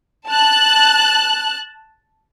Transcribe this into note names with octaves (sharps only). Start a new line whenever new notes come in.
A5 F#6